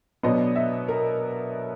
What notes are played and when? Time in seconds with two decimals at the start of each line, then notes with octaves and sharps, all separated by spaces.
0.23 B2 F#3 B3 D4 D#5
0.56 E5
0.88 A#4